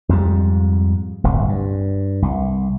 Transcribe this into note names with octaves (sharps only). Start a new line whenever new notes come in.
F2 G#2 B2 G3
D1 G1 C2
G2
C2